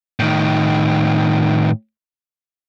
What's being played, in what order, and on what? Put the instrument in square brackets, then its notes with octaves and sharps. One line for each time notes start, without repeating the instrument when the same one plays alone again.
[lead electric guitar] A2 D#3